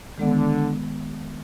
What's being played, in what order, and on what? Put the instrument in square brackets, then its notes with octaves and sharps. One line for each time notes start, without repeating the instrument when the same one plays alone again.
[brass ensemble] D3 [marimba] D#3 G#3 B3